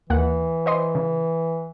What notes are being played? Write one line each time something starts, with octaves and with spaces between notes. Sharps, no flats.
D#2 E3 A#3 F#5
C5 D#5 C6
C#3